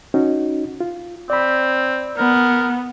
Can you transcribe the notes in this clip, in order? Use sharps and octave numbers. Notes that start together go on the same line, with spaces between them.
C#4 D#4 F#4
F4
C4 D5 B5
B3 A#4